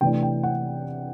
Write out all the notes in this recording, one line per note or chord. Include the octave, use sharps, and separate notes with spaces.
C3 E3 A3 D4 G5
G5
F#5